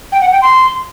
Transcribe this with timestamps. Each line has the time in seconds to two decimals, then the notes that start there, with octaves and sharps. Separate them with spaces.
0.12 G5
0.21 F#5
0.32 G5
0.42 C6